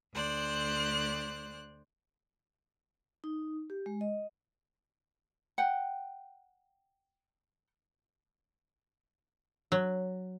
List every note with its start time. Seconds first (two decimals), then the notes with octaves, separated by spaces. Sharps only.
0.13 D2 C5 D5 F#6
3.24 D#4
3.70 G4
3.86 G#3
4.01 D#5
5.58 F#5 G5
9.72 F#3